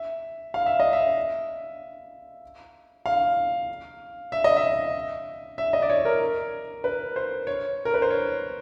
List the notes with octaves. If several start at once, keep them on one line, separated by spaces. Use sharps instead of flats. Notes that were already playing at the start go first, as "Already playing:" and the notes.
Already playing: E5
F5
E5
D#5
E5
F5
E5
D#5
E5
E5
D#5
D5
C#5
A#4
B4
C5
C#5
A#4
B4
C5
C#5